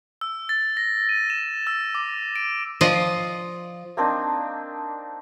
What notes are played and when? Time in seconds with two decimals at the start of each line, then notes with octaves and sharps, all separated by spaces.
0.21 E6
0.49 A6
0.77 A#6
1.09 D#7
1.30 E7
1.67 E6
1.95 D6
2.36 D7
2.81 F3 F4 D5 D#5
3.97 A#3 C4 D4 D#4